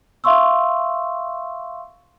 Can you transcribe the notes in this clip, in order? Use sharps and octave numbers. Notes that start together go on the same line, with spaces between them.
E5 F5 C6 C#6 E6